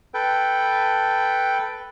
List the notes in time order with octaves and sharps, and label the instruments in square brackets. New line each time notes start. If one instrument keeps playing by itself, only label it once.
[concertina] A4 B4 G5